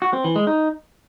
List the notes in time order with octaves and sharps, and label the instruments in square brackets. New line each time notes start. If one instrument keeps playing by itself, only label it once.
[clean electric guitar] F#4
C4
E3
G#3
D#4